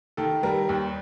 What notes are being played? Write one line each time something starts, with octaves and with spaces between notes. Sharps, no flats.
D#3 A4
G3 A#4
D#2